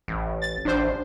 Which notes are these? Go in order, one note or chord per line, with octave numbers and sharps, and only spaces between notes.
A1
A6
A1 D4 C5